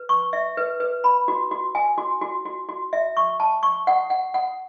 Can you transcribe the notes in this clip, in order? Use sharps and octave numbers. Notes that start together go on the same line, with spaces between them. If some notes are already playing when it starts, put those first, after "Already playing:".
Already playing: B4
C#6
E5
B4
B4
B5
F#4
F#4
G#5
F#4
F#4
F#4
F#4
E5
C#6
A5
C#6
F#5
F#5
F#5